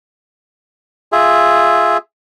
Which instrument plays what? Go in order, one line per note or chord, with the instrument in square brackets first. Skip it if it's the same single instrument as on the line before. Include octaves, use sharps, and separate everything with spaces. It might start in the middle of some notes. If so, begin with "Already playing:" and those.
[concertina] F4 G#4 E5